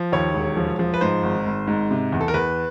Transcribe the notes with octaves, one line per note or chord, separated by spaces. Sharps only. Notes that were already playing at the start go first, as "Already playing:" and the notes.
Already playing: F3
D#2 C#5
E1
F3
F3
B4
G#2 C5
G#1
G#1
G#2
C3
E2
A4
A#4
E2 B4